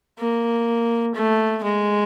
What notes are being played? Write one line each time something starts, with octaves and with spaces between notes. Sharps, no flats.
A#3
A3
G#3